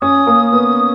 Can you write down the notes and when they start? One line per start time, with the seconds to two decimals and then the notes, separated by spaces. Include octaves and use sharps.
0.01 C#4 D#6
0.27 A#3
0.53 B3